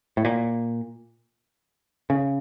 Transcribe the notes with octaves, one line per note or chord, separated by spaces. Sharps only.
A2
A#2
C#3